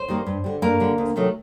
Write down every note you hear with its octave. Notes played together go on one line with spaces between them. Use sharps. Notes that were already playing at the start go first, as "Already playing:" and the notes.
Already playing: C5
D#3 G3 A#3
G2
D3 G3
G2 A#3 A#4
D3 G3
D2
C3 D#3 F#3 A3